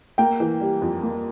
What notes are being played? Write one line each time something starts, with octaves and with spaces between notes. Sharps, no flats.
A#3 G5
E3
G3
F2
A#3